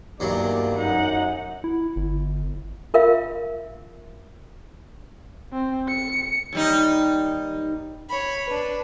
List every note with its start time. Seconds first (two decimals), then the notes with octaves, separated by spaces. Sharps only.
0.20 E2 G2 D#3 F#3 A#3 D5
0.77 F#2 D#4 F#5
1.64 E4
1.96 G1
2.94 F4 A#4 E5 F5
5.53 C4
5.88 C#7
6.53 D#2 G3 D#4
8.09 C#5 B5
8.46 D4 B4